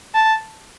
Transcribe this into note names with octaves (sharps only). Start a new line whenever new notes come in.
A5